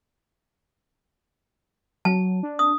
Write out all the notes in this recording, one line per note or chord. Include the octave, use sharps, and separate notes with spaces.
F#3 A5
D4
D#6